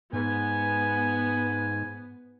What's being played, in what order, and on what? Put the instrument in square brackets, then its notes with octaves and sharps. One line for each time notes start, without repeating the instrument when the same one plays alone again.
[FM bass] G#2 [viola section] B3 [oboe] G#5